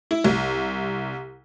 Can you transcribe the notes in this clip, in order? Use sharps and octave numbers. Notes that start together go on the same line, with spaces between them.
E4
C2